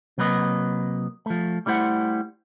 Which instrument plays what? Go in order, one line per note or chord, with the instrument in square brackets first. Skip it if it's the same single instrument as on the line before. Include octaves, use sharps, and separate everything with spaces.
[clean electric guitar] C3 F#3 A#3 B4 D#5
F3 A3
G3 A3 E4 C5 F#5